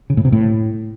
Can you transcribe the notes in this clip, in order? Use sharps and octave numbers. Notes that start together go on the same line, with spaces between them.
C#3
A2
C3
A2